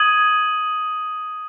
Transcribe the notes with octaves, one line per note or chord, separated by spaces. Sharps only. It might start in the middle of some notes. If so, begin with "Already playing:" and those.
Already playing: D#6 G#6 D#7 F#7